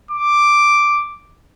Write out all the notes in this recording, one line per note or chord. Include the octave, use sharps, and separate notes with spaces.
D6